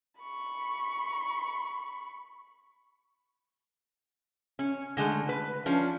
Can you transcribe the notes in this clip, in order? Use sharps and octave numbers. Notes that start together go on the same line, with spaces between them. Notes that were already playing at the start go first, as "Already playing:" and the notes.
B5 C#6
C#4
D3 G#3 A3
B4
F3 C#4 D4